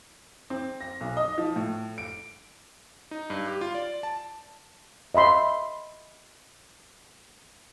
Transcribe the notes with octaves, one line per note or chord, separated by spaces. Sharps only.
C4
A#6
B1
D#5
F3
A2
D7
D#4
G2
G4
F4
D5
A5
D#5 E5 B5 C6